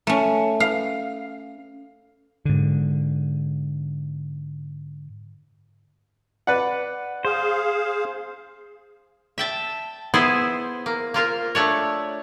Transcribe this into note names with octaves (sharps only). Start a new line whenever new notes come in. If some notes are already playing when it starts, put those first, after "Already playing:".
A3 C#4
F5
G#2 D3
B4 D5 F#5
G#4 C5 F5
E5 G5 A5
B3 E4 G#4 C5
A#3
A#3 F4 A#4
A3 D4 C#5